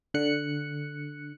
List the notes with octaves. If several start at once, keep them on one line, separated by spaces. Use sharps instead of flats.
D3 F#6 C#7